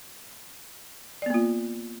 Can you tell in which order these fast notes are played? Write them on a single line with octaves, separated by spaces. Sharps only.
D5 B3 A#3 F4